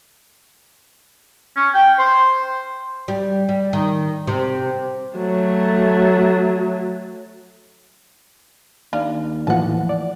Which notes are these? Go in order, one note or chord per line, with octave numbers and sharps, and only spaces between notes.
C#4
G5
C5
G3
G3
D#3
C3
F#3 A3
D#2 D4 F5
A2 E3 F3 F#5 A5
D5